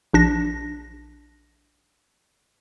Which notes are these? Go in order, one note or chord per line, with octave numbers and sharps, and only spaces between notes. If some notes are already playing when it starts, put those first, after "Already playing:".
A#1 D4 A#6